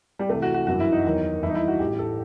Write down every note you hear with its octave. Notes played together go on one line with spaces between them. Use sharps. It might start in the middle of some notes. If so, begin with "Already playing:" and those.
G3
C2 C3 E3 A3
F#4
F#4
G1 F#2 E3 F#4
E4
D#4
E2 D#3 F#3
G1 G2 E3 E4
D#4
E4
F#4
A1 A2 E3 G4
A4